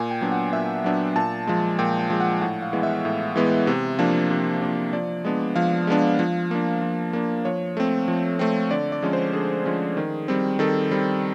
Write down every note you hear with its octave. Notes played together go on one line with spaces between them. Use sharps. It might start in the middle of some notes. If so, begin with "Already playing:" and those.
Already playing: A#2 G#5
G5
F#3 B3 D4
F#5
A#2 E5
F#3 B3 D4
A#2 A5
F3 G#3
A#2 G5
G5
F3 G#3
F#5
A2 F#5
F5
E3 G#3 B3
E5
A2
E3 G#3 B3
C3
F3 A#3 D4
C3
F3 A#3 D4
F3 D5
G#3 B3 D4
F3 F5
G#3 B3 D4
F3
A#3 D4
F3
A#3 D4
F3 C#5
A3 C4
F3
A3 C4
D3 D5
D5
F3 G#3 C#4
C5
D3 G#4
F3 G#3 C#4
D#3
G3 C4
D#3 A4
G3 C4